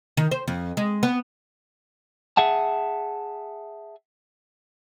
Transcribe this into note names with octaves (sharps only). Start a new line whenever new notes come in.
D#3
C5
F2
G#3
B3
G#4 E5 F#5 A5